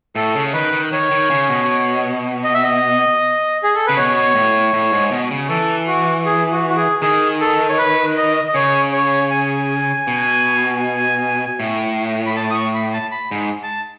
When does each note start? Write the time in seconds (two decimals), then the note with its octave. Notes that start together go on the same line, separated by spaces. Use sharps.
0.15 A2 A4
0.35 C#3
0.54 D#3 B4
0.73 D#3
0.92 D#3 C#5
1.11 D#3
1.30 C#3
1.49 B2
2.44 D#5
2.54 E5
2.64 D#5
3.63 G#4
3.75 A4
3.86 C#3 B4
3.97 B2 C#5
4.35 A2
4.73 A2
4.93 G#2
5.11 B2
5.31 C#3
5.49 E3 A4
5.87 F#4
6.26 G#4
6.51 F#4
6.69 F#4
6.77 G#4
7.02 D#3 G#4
7.41 A4
7.69 C#5
7.78 B4
8.17 D#5
8.48 D#5
8.54 C#3 C#5
8.92 C#5
9.31 G#5
10.07 B2
11.60 A2
12.26 B5
12.36 A5
12.51 D#6
12.55 C#6
12.75 B5
12.93 A5
13.11 B5
13.31 G#2
13.63 A5